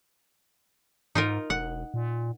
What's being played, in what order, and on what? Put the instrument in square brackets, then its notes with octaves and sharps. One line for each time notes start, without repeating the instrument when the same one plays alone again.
[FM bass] G#2 [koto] D#4 F4 A#4
[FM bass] E1 [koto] F#5
[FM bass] A#2